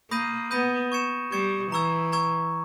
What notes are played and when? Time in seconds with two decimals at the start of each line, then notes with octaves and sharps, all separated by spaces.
0.11 A#3 B5 D#6 G6 A#6 D#7
0.51 B3 B5 D#6 G6 A#6 D#7
0.92 C#6 G#6 C#7 E7
1.32 G3 C#6 G#6 C#7 E7
1.72 E3 A#5 C#6 E6 G#6
2.12 A#5 C#6 E6 G#6